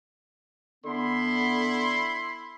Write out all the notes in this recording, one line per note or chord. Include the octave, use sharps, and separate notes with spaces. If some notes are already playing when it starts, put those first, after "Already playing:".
D3 B3 E4 B5 C6